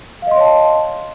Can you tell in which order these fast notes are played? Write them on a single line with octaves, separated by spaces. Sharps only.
F5 D#5 C6 C#5 A5